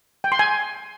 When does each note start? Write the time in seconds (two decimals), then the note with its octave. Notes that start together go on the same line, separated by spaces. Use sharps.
0.24 G5
0.32 C6
0.39 G#5